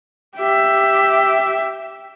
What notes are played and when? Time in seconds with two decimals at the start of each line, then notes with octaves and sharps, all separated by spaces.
0.37 G4 E5